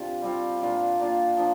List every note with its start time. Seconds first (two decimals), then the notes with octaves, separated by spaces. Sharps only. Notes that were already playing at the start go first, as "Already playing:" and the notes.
Already playing: C3 D4 F4
0.22 G3 C4 F4
0.60 A#2 A#3 D4 F4
1.00 A#2 A#3 D4 F4
1.37 F3 D4